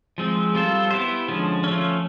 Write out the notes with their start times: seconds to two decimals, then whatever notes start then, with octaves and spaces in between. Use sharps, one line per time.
0.18 F3 G#3 C4
0.55 G3 C4 F4 A4 C5
0.91 B3 E4 G4 C5
1.28 D3 F3 G#3 C#4
1.64 F3 A3 C#4